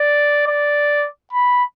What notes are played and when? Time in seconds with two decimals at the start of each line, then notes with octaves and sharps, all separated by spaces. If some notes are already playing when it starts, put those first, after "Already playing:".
Already playing: D5
0.47 D5
1.33 B5